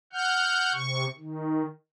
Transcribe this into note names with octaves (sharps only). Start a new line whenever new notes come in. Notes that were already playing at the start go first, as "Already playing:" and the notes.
F#5 F6 G6
C3 C#6
D#3